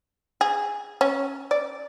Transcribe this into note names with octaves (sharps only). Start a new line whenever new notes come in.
G#4
C#4
D5